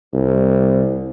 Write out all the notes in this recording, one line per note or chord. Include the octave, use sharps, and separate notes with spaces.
C2